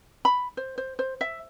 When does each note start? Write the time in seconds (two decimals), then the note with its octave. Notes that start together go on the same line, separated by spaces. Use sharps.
0.25 B5
0.57 C5
0.78 C5
0.99 C5
1.21 E5